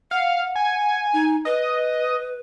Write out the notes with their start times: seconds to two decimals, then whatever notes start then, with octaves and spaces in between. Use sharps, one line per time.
0.11 F5 F#5
0.56 G#5
1.13 D#4
1.45 B4 D#5